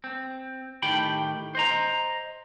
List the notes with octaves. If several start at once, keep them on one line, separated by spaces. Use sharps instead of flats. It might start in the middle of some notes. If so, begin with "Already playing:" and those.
C4
A2 D#3 G4 G5 B5
C5 D#5 A#5